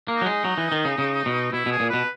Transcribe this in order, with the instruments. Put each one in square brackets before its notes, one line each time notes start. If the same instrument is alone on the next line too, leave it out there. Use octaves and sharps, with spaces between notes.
[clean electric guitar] A#3
[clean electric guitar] F#3 [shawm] D#4
[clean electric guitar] G#3
F#3
E3
D#3
C#3
C#3
B2
[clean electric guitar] B2 [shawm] E4
[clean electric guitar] B2 [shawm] G#4
[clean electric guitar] A#2
[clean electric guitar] B2 [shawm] B4